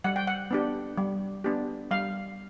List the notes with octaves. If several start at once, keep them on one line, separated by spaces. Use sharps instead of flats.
G3 F#5
G5
F#5
B3 D4 G4
G3
B3 D4 G4
G3 F5